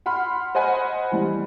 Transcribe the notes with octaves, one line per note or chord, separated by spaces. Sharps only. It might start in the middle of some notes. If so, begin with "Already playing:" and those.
F#5 B5 C6 F6
C5 D#5 F#5 G#5 B5
E3 G3